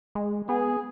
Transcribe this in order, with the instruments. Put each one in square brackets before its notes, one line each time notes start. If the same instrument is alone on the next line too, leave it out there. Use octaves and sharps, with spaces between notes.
[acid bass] G#3
[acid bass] B3 [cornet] G#4